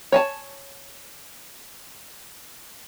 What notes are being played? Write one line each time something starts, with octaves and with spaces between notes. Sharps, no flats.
C#5 G#5 A5